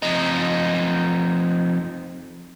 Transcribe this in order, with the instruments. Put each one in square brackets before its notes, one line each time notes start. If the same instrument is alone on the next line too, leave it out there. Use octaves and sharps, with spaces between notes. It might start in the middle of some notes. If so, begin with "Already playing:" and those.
[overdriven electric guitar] F2 D#4